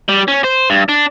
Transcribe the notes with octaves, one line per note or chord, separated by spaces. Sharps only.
G3
C#4
C5
G2
D4